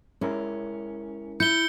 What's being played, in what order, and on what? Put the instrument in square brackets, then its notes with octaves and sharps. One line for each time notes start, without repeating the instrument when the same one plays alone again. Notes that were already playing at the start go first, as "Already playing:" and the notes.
[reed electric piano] G#3 E4 A#4 [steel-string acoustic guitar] C#4
[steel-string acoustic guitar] E4 [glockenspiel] G6 [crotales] C#7 G7